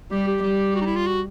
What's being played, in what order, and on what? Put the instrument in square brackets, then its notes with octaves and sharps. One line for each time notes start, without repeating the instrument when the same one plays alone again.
[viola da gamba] G3 [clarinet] G4
[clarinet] G4
[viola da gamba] G3
[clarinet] F#4
D#4
E4
F4
F#4